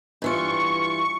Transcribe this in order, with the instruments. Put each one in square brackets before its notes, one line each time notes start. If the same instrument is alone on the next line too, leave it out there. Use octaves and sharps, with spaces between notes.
[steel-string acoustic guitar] G2 E3 F4 [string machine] C#6